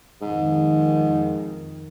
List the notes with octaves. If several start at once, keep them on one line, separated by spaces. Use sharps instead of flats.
F2 G#2 D#3